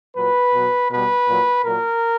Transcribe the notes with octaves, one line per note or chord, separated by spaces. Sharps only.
A#2 F#3 B4
B2 F#3
B2 G3 B4
A#2 F#3
A#2 F#3 A#4